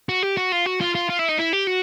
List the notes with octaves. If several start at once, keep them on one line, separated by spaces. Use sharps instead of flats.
F#4
G4
F#4
F4
F#4
F4
F4
F4
E4
D#4
E4
G4
F#4